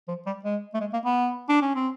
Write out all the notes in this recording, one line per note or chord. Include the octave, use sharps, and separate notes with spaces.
F3
G3
G#3
A3
G#3
A#3
B3
D4
C#4
C4